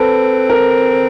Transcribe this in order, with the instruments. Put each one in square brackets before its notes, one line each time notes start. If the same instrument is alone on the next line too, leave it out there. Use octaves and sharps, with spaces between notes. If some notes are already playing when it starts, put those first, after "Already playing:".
Already playing: [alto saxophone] C4 [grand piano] A4 B4
[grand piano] A#4